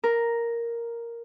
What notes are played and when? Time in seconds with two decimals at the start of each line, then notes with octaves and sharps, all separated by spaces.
0.04 A#4